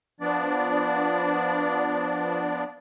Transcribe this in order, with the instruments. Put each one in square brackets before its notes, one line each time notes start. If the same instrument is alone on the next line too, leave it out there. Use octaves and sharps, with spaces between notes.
[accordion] F3 B3 D4 D5